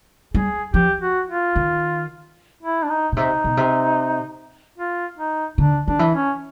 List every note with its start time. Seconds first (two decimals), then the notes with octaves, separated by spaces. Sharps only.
0.34 G3 G#4
0.74 F3 G4
1.01 F#4
1.29 F4
1.56 D#3
2.63 E4
2.83 D4
2.89 D#4
3.12 B2
3.16 C3 D#4
3.44 B2
3.57 C3
4.78 F4
5.18 D#4
5.58 D3 D4
5.85 D#3 D4
5.99 E3
6.13 C#4